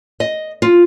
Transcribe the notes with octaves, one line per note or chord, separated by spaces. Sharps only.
D#5
F4